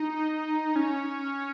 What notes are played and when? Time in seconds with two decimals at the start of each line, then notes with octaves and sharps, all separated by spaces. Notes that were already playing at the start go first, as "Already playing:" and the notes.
Already playing: D#4
0.76 C#4